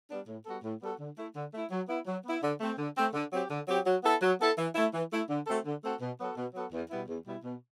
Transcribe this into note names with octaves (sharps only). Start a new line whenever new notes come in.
G3 B3 D4
A2
G3 B3 F#4 A4
A2
G3 B3 F#4 A4
D3
A3 E4
D3
A3 E4
F#3
B3 E4
F#3
B3 E4
D3
A3 C4
D3
A3 C4
D3
F#3 C4 G4
D3
F#3 C4 G4
F#3
B3 E4 A4
F#3
B3 E4 A4
E3
A3 E4
E3
A3 E4
D3
A3 C4 F#4 A4
D3
A3 C4 F#4 A4
B2
F#3 B3 F#4 A4
B2
F#3 B3 F#4 A4
E2
B2 G3 B3 E4
E2
B2 G3 B3 E4
B2